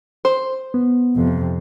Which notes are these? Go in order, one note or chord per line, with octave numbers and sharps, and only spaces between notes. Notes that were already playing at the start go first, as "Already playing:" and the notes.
C5
B3
F2 C3